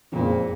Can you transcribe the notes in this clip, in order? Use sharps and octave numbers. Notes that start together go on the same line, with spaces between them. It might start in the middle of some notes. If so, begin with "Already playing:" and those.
F#1 F2 A#2 C#3 G#3 C4